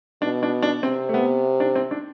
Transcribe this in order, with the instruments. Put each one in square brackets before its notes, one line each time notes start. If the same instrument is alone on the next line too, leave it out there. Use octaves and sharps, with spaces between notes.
[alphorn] B2 [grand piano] D4
[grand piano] D4
D4
[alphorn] C3 [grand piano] C4
[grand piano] A3
B3
D4
C4
D4